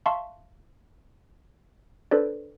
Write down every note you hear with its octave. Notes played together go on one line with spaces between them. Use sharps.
E5 F5 A5 C6 C#6
D4 A4 B4 C5 D5